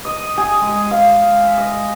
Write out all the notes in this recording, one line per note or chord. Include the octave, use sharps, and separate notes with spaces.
D#5
G#4
G#3
F5
E5
D#5